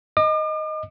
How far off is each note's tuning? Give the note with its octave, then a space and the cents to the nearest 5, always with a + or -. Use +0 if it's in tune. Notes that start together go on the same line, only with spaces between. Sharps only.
D#5 +0 D6 +45